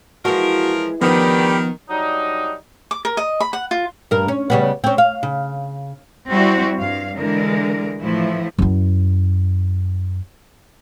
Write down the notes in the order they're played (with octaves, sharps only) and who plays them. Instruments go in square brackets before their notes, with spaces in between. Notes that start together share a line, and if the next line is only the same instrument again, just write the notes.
[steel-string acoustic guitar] E3 G#3 [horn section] F3 A#4 [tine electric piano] F#4
[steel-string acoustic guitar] D2 B4 [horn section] D#3 [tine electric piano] F3 B3 [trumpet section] G4 D5 B5
[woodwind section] F#3 G3 D4 D#4
[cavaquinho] D6
A#4
D#5
B5
F#5
F4
[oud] G2 A#4
C#4
C#3 G3 B3
C4 C#4
F5
C#3
[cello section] G3 C4 E4 F#4
G2 F5
D3 E3 G#3 A#4
A2 E3 F3 E4
[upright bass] F#2 E4